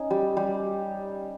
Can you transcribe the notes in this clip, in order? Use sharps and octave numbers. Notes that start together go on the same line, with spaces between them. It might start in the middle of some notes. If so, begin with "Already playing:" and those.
Already playing: C#4 D#4
G3
G3